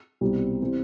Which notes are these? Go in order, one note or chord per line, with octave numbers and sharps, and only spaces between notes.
C2 B2 G3 C4
E3 G3 C4 E4